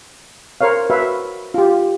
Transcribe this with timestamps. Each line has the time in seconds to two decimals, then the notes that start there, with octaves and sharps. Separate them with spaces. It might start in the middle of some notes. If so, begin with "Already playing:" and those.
0.61 A#4 C5 C#5 F5
0.90 F#4 B4 E5 F5
1.54 F4 G4